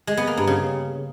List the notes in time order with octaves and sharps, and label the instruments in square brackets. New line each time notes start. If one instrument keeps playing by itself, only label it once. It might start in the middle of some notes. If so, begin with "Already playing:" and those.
[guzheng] G#3
B3
A#3
G2
C#3